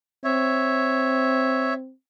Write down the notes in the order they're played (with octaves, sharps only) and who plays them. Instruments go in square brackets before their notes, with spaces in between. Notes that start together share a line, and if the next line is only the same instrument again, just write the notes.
[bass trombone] C4 [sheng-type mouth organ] C#5 E5